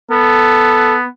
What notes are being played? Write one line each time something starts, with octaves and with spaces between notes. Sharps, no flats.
B3 A4